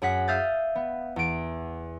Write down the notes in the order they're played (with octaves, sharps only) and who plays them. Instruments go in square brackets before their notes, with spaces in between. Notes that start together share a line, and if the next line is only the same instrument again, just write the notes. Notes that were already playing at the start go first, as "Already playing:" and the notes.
[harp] F#2 G#4 F#5 B6
E5 F5 D#6 G6 A6
B3
E2 D7